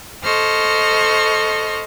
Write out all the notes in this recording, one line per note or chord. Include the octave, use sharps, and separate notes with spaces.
A4 C5 D#5 C#6 F6